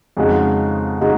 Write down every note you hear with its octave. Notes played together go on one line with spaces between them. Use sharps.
F2 C#3 G#3 D#4 F#4
C#3 G#3 D#4 F#4